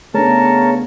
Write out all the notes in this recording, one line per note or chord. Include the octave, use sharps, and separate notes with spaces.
C#3 A3 B3 D4 G#4 A#4 C#5 A5